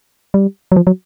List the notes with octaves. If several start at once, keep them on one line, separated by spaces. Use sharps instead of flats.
G3
F#3
F3
F#3